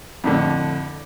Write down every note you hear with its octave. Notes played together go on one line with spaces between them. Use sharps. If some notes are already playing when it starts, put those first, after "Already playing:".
F2 A2 D3